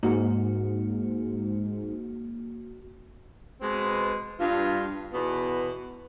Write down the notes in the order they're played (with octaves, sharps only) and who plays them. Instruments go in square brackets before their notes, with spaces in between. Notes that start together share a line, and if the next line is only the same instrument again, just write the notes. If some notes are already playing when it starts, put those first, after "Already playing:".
[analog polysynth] G#2 [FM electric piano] A#3 F#4
[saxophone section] B2 G#3 B3 C4
G2 F4
E2 B2 B3